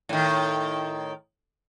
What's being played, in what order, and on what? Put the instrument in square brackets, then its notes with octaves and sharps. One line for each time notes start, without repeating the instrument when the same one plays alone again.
[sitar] A2 D#3